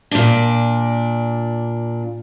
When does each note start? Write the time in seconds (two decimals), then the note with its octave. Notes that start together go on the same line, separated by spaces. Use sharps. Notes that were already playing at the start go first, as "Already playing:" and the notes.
0.11 A#2 D4